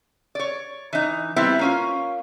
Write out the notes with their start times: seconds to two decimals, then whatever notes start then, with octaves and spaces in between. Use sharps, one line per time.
0.35 C#5 D5
0.93 E3 D#4
1.36 G3 B3 C4 E4
1.59 A#3 C#4 F4